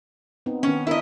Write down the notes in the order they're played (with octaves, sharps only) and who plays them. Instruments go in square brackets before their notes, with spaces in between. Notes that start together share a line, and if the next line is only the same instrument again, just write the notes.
[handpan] B3 C4 D#4
[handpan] D#3 B3 [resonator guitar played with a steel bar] C#4
[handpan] D4 A#4 E5 [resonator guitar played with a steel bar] E4 D#5